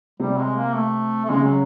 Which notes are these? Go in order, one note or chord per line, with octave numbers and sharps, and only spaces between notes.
C3 G3
G#3
A#3
A3
A3
C#3 G#3
F#3